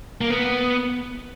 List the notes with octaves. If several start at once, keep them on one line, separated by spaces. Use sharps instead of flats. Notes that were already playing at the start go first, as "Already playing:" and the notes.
A#3
B3